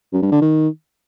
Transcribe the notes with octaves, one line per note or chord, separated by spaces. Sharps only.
F#2
G2
D3
D#3